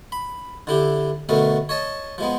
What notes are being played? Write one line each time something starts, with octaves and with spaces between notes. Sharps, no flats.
B5
D3 E4 G4
B2 D3 A3 B3 A#4
C#5 D#5 A5
F3 G#3 B3